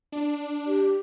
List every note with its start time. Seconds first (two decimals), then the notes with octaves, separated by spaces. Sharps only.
0.12 D4
0.67 G4